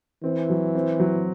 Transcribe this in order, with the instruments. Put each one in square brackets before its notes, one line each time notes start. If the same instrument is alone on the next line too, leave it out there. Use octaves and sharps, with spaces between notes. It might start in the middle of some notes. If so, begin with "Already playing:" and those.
[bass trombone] E3 [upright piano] C4
[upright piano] F#3
C4
F#3